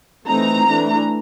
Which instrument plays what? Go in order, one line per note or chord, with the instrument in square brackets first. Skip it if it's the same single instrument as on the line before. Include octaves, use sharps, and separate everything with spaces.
[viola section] E3 A3 C4 D#4 A#5
E3 A3 D4